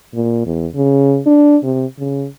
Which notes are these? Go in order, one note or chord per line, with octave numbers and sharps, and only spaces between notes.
A#2
E2
C#3
D4
C3
C#3